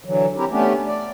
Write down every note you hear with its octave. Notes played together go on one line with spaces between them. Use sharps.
D3 E3 F#3
C4 E4 G4 A#4
A3 B3 C#4 D4 G4
D5